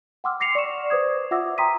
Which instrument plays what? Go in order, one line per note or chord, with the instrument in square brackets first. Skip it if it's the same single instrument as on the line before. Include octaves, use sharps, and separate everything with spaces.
[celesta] F#5 G5 C6 D6 E6 F6
D6 A#6 C7 C#7 F7
D5 C#6 E7
B4 C5 D6 D#6 G#6
F4 E5 F#5 D6 E6 A#6
G5 A#5 C6 D#6 B6 D#7